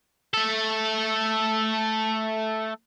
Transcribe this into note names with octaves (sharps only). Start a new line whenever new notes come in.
A3 A4